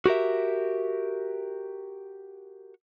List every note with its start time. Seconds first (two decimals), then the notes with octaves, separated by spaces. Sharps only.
0.06 F#4 G4 A#4 E5